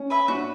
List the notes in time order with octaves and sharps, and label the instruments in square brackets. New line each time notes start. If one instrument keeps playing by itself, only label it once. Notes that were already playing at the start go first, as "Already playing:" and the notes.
Already playing: [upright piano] C#4
[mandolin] B4 E5 G#5
[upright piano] D4 [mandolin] F#4